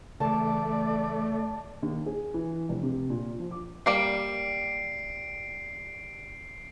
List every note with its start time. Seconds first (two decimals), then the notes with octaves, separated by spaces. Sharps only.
0.20 C#3 E3 A3 D5 A5
1.82 D#2
2.06 G#4
2.34 E3
2.69 F1
2.83 C3
3.10 A#2
3.40 F3
3.51 D6
3.86 G3 A#3 G4 C7 D7